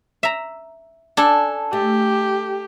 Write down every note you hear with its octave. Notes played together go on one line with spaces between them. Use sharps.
E5 A#5
D4 A4 G#5
A3 G4